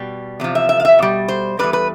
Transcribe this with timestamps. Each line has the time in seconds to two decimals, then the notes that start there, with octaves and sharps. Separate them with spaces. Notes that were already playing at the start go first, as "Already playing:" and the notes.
Already playing: B2 G3
0.40 E2 C3 F3
0.55 E5
0.69 E5
0.80 F5
0.85 E5
0.99 B2 G3
1.28 C5
1.59 B2 G3 B4
1.63 E2
1.73 B4